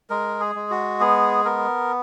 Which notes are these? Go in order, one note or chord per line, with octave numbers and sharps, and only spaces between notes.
G#3 A#4
G#4
G#3
F#4
B3 G#4
B3 A#4